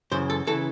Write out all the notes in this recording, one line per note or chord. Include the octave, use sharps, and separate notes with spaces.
F#2 C#3 E3 C5
A4
C#3 E3 A4